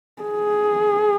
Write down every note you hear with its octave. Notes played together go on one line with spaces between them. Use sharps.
G#4